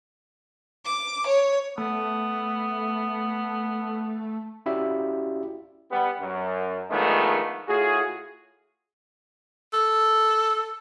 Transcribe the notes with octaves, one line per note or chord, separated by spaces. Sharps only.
D6
C#5
A3 B3
C#4 E4 F#4 G4 D5 E5
G3 B3
F#2
D#3 F3 G#3 A3 B3 D4
A2 F4 F#4 G#4
A4